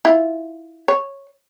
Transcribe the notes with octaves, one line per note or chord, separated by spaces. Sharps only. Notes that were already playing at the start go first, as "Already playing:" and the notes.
E4 F4
C#5